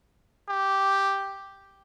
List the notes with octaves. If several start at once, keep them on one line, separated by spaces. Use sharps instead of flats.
G4